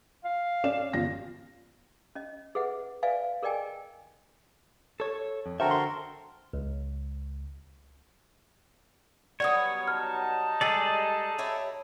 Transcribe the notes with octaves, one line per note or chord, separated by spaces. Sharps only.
F5
C#4 D5 E7
G1 F3 A#6
C#4 D#5
G#4 B4 E5 F#5
B4 D5 E5 F5 G#5
G#4 A#4 D5 D#5 G5 G#5
A4 C#5
F2
D3 F#4 A4 A#4 C5 E5 G5
C6
C#2
F#3 G3 B3 C#5 D5 D#6
D#4 A5 F6
G3 G#3 G#4 A4 D5
E4 G4 C#5